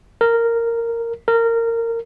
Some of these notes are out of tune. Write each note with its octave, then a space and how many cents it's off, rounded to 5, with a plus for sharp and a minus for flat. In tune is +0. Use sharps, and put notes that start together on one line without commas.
A#4 -10
A#4 -20